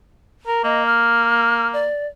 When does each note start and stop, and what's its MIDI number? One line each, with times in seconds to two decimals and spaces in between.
0.47 0.62 70
0.64 1.88 58
0.64 0.83 75
0.87 1.68 89
1.73 2.07 74